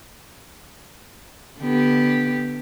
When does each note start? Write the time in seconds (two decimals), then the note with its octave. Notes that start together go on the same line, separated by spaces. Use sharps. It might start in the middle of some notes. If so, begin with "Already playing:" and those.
1.60 D3 B3 G4